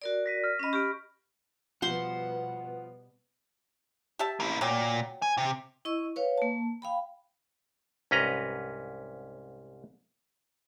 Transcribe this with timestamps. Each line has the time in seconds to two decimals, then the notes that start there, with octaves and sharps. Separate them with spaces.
0.02 F#4 A#4 D5
0.26 A#6 B6 D#7
0.44 F6 B6
0.59 C#4 D#5 B5 F6
0.73 G4 D#5 C#6 F6 D7
1.82 B2 F3 G3 B3 C5 F#5 C6
4.19 G4 E5 A5
4.40 A#3 E4
4.61 A#2 F#3 G5
5.22 G#5
5.37 C3
5.85 E4 D#5 C#6 E6
6.16 B4 C#5 F5
6.38 A#3 A5
6.82 F5 G5 B5
8.11 C2 G#2 C#4 B4 D#5 A#5